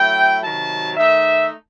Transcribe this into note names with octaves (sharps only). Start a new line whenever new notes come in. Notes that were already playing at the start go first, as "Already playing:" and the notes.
Already playing: F#3 A3 E4 G5
C3 D#3 F#3 A5
D#3 A3 D#4 E5